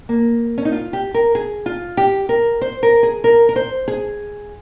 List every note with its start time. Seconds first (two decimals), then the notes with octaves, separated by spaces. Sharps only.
0.09 A#3
0.58 C#4
0.65 D#4
0.72 F4
0.93 G4
1.14 A#4
1.35 G#4
1.66 F4
1.97 G4
2.29 A#4
2.61 C5
2.83 A#4
3.03 G#4
3.24 A#4
3.49 A#4
3.56 C5
3.88 G#4